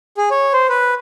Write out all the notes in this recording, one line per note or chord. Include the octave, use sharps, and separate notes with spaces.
G#4
C#5
C5
B4